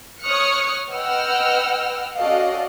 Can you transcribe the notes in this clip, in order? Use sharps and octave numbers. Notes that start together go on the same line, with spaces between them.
C#5 C#6 D#6 F6 F#6 C#7
B4 D#5 F#5 G5 E6 F6
C#4 F#4 A4 D5 D#5 F5